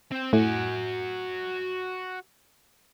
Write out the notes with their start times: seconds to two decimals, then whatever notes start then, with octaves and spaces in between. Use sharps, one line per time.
0.11 C4
0.33 A2 F#4 G#5